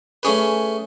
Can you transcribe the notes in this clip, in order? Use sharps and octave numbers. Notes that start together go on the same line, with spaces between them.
A3 C#4 G#4 B4